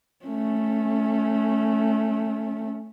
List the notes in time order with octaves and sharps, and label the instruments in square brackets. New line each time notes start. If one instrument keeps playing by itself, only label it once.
[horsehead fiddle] A3 C#4